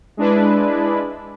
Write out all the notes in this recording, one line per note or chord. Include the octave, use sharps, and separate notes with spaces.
G#3 D4 E4 B4